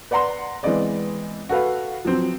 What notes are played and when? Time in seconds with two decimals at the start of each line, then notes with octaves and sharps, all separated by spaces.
0.11 B4 D5 F#5 A#5 C6
0.63 E3 G#3 B3 C4 D5 D#5
1.49 F#4 A4 B4 F5
2.05 F3 F#3 C4